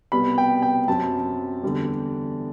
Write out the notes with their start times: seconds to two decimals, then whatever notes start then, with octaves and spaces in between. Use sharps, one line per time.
0.12 C2 B2 G3 B3 B5
0.38 G5
0.62 G5
0.88 F#2 F#3 C4 A5
1.63 E2 D3 G3